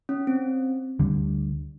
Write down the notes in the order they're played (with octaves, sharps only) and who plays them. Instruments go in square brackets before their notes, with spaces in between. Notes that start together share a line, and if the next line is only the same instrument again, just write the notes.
[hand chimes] C#4
C4
[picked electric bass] D2 D3 G3